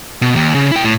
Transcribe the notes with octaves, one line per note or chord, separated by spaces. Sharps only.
B2
D#2
C#3
E4 G5
A2